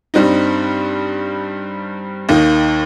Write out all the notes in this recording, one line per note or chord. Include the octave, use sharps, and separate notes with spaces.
G2 G3 C4 D#4
D#2 D#3 A#3 D#4